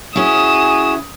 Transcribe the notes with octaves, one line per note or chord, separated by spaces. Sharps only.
C#4 E4 F#4 G#4 D#6 E7